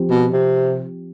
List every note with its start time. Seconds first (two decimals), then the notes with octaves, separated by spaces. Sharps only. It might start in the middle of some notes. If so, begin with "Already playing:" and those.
Already playing: F3 C4 G4
0.10 B2
0.33 C3